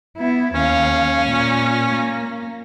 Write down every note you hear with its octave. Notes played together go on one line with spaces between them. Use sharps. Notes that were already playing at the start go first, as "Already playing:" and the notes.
B3 E4
D#2 C#4 F5
A#2
A#3